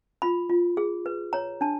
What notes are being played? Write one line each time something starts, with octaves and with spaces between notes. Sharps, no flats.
F4 B5
F4
G#4
B4
C#5 A#5
D4 A5